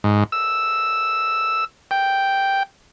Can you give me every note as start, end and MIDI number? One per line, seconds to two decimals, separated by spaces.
0.04 0.24 44
0.32 1.65 88
1.91 2.63 79